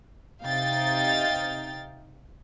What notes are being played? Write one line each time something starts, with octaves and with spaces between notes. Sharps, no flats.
C3 D#4 F5 G5 A6